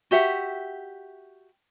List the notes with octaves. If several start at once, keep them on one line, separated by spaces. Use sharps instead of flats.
F#4 G4 E5 F#5